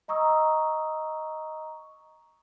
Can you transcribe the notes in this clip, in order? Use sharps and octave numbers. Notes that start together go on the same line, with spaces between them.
D#5 A#5 C#6 D#6 E6